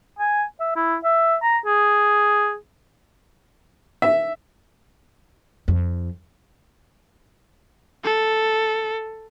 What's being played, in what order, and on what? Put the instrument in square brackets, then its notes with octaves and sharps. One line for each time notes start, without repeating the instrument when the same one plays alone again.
[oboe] G#5
E5
E4
E5
A#5
G#4
[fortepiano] E5
[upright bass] F2
[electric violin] A4